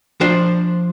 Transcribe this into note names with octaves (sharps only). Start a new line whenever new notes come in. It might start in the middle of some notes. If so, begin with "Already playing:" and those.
F3 D4 C5